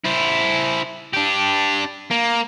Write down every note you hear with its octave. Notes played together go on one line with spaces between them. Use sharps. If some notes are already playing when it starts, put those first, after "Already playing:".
E4 C5
D4 G4
A#3